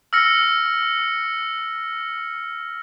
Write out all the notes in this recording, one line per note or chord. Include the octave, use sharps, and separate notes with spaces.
E6 F6 A#6 C#7